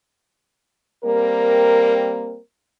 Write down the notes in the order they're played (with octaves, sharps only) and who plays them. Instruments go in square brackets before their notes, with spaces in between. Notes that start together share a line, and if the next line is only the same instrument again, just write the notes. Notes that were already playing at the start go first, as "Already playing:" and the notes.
[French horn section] G3 A#3 C4 A#4